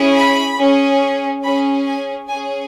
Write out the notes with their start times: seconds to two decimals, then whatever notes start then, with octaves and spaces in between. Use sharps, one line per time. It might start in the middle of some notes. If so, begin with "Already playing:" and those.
Already playing: C#4 E4 G#4
0.15 B5
0.58 C#4 G#4
1.43 C#4 G#4 B5
1.86 G#5
2.28 C#4 G#4 G#5